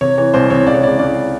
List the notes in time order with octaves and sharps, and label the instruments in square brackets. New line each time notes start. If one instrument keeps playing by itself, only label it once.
[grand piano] C3 C#5
E3 C#5
C2 C5
C3 C#5
C#2 D5
C#5
C#2 D5
C#2 D5